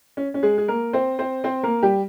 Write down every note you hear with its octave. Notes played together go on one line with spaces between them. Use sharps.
C#4
C#4
G#3 G#4
G#4
A#3 A#4
C4 C5
C4 C5
C4 C5
A#3 A#4
G3 G4